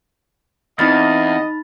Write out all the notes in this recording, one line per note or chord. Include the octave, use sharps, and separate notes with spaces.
E2 C4 D#4 E4 D#5 B5 F6 A6